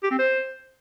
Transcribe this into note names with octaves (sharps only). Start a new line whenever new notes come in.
G4
C4
C5